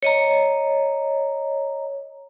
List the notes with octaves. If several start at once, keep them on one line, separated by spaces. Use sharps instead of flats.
C#5 D#5 A#5